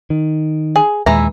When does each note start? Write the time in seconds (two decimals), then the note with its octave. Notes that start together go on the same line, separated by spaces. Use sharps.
0.10 D#3
0.76 G#4
1.06 D#2 A#2 E3 G#3 E4 A#5